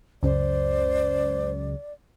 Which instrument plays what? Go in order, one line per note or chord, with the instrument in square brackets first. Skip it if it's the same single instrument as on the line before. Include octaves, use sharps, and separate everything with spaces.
[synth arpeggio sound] C#2 F#2 C#3 [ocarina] C5 [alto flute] D5